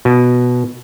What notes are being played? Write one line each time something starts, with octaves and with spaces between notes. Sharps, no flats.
B2